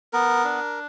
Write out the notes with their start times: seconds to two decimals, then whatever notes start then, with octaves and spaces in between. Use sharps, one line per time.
0.13 B3 A#4
0.44 D4